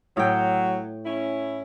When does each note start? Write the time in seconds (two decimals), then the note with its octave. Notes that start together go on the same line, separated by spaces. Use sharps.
0.17 A2 F#3 G5
1.05 C#4 E4